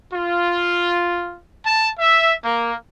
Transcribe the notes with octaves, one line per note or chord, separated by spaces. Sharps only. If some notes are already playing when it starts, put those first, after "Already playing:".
F4
A5
E5
A#3